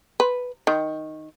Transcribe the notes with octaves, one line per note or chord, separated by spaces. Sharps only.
B4
D#3